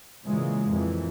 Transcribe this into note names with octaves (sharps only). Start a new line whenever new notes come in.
A#2 C#3 E3 G#3
F2 A#2 E3